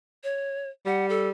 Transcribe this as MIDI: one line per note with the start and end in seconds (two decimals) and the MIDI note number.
0.24 0.70 73
0.86 1.31 55
0.86 1.06 78
1.09 1.29 69